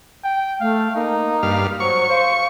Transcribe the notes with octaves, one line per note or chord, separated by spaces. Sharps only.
G5
A3 F5
A#3 D#4
G2 F5
F#3 C5 C#6
C5 F5